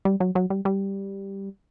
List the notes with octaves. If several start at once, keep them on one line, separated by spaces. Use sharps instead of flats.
G3
F#3
F#3
G3
G3